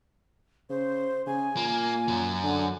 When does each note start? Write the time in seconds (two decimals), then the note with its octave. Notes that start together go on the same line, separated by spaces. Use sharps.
0.70 C#3 C5
1.27 C#3 G#5
1.57 A#2 A#3
2.08 F#2 F#3
2.43 D3